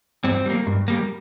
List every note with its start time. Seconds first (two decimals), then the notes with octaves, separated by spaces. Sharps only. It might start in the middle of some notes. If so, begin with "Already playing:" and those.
0.24 G2 C4
0.46 G3 A#3
0.67 G2
0.88 G3 A#3